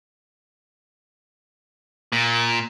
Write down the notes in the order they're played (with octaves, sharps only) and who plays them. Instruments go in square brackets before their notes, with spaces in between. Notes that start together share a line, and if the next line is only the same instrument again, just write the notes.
[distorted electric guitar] A#2